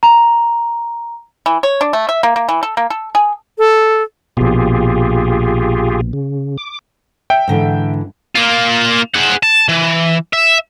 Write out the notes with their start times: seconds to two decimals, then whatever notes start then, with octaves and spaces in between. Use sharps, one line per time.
0.03 A#5
1.46 E3
1.63 C#5
1.81 D4
1.93 A3
2.09 E5
2.23 A#3
2.36 A#3
2.49 E3
2.63 A4
2.77 A#3
2.90 A4
3.15 G#4
3.58 A4
4.37 A#1 B2 F4 G4 G#4
6.13 C#3
6.58 D6
7.30 E5 G5
7.48 G#2 D3 E3
8.35 A#3 F4
9.14 G#4 F#5
9.43 A5
9.68 E3
10.33 E5